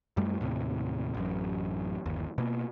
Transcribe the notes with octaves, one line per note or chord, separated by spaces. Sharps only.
F#2 G3 A3
D#2 A2 C3
A1 F#2
G1 D#2
B2 A#3